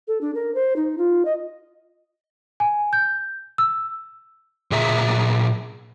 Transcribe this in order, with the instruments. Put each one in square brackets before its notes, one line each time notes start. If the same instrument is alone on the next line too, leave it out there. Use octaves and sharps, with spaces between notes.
[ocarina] A4
D4
A#4
C5
D#4
F4
D#5
[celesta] G#5
G6
E6
[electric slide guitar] A#2 G#4 E5 A#5